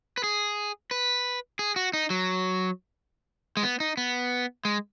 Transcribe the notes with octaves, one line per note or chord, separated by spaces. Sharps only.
B4
G#4
B4
G#4
F#4
D#4
F#3
G#3
B3
D#4
B3
G#3